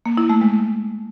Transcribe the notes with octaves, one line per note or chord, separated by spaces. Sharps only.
A#3
E4
A3
G#3